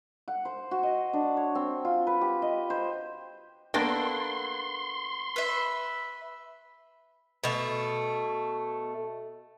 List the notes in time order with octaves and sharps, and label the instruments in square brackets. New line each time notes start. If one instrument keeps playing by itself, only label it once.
[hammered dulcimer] F#5
C5
F#4
D#5
D4
C#5
C4
F4
B4
G4
D#5
C5
[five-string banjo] A#3 B3 A4 [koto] D4 A#4 G5 [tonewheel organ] C6
[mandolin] B4 E5
[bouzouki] B2 A3